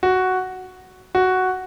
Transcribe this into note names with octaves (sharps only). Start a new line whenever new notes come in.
F#4
F#4